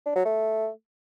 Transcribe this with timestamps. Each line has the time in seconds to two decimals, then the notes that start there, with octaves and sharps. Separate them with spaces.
0.06 D4
0.16 F#3
0.25 A3